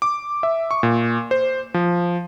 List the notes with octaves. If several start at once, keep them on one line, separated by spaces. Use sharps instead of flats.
D6
E5
C#6
A#2
C5
F3